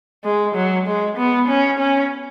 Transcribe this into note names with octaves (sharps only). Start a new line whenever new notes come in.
G#3
F#3
G#3
B3
C#4
C#4